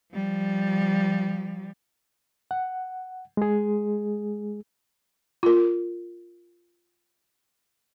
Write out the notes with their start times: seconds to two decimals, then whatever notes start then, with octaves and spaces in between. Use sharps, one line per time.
0.13 F3 G3
2.51 F#5
3.37 G#3 G#4
5.43 F4 A#4